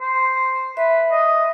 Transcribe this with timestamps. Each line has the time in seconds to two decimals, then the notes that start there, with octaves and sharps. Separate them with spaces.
0.01 C5
0.77 B4 E5
1.11 D#5